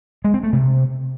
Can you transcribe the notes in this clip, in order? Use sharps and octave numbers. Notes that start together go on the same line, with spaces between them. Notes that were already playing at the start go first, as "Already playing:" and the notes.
G#3
C4
A3
C3